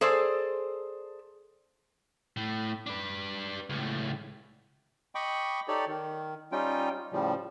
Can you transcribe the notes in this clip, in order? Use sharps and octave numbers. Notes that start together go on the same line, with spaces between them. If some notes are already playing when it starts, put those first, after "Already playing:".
G#4 A4 C5 D5
A2
D4 B4
C#2 A2
D#5 G5 B5 C#6 D6
D#4 G4 A4 C#5 D5
D#3
G3 C#4 D#4 F4 G5
A2 C#3 F3 G3